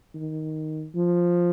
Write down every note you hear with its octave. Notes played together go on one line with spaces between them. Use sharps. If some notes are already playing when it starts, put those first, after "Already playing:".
D#3
F3